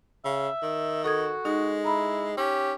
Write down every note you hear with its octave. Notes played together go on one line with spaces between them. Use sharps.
C#3 E5
D#3
F#4 A4 D#6 G#6
G#3 D#4
E4 A#5 B5
C#4 G4